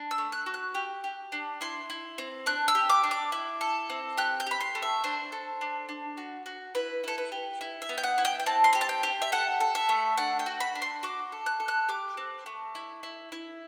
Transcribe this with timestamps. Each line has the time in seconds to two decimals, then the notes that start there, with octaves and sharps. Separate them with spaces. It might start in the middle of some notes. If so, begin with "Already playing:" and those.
Already playing: D4
0.11 E6
0.18 A3
0.32 F#6
0.46 F#4
0.54 F#6
0.75 G4
1.04 G4
1.32 D4
1.61 E4 C6
1.90 E4
2.18 C4
2.46 D4 F#6
2.68 E6
2.75 G4
2.90 D6
3.03 D4
3.11 D6
3.32 E4
3.61 A4
3.90 C4
4.17 G4 F#6
4.40 G6
4.47 G4 B5
4.61 C6
4.75 A3
4.82 E5
5.04 D4 C5
5.32 A4
5.61 D4
5.89 D4
6.17 F#4
6.46 F#4
6.75 E4 B4
7.04 E4 A4
7.18 B4
7.32 G4
7.61 E4
7.82 E5
7.89 B3
7.98 G5
8.03 F#5
8.18 E4
8.25 G5
8.40 G5
8.46 C4 A5
8.64 C6
8.73 G4 B5
8.81 A5
8.89 G5
9.03 G4
9.22 E5
9.32 A4 F#5
9.60 A4
9.75 E5
9.89 A3
10.17 D4 F#5
10.39 G5
10.46 F#4
10.60 B5
10.75 D4
10.82 C6
11.03 F#4 D6
11.32 A4
11.46 F#6
11.60 A4
11.68 F#6
11.89 G4 D6
12.17 C4
12.46 A3
12.75 E4
13.03 E4
13.32 E4